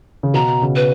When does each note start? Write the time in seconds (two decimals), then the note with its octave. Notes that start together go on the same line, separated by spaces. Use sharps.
0.23 C#3
0.34 B2 A#5
0.62 C#3
0.76 B4